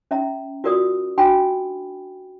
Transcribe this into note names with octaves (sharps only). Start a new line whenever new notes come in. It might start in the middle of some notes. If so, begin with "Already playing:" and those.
C#4 E5 A#5
F4 F#4 A#4 D5 D#6
D4 F#4 G5 G#5 B5